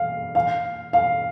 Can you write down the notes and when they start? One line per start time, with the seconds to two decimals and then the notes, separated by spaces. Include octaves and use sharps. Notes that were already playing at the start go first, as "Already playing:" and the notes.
Already playing: F5
0.35 F5
0.93 F5